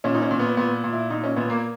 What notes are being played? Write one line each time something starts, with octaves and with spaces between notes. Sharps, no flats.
A#2 C#4
D#4
C#4
A#2
B3
A#2 B3
A#2
E4
A#2 D#4
C#4
A#2 B3
A#3